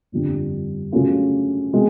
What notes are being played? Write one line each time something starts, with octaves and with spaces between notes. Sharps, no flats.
G1 F2 D3 G3 C4
C#3 F#3 A3 C#4 F4
B2 G#3 C4